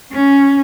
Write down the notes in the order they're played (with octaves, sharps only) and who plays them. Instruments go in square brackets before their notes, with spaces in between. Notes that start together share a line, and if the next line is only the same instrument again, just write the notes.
[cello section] C#4